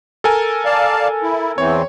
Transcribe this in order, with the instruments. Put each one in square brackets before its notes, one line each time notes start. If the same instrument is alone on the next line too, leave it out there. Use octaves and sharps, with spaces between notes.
[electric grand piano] A4 A#4 G#5
[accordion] D5 F5 A5
E4
[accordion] E2 E3 C4 [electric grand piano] C#5